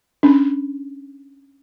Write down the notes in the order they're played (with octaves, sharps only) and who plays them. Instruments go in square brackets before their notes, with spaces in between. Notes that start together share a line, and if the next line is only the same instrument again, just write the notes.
[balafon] C#4 D4